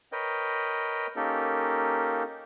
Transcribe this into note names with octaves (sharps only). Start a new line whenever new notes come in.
A#4 B4 C#5 D#5 G5
A#3 C#4 D#4 G4 A4 A#4